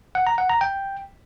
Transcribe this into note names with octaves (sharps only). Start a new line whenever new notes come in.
F#5
A#5
F#5
A#5
G5